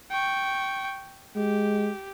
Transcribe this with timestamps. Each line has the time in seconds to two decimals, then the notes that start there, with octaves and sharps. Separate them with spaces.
0.11 G5 C#6
1.36 G#3 G4